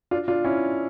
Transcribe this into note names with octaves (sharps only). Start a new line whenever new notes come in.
D4 F4
D4 F4
C#4 E4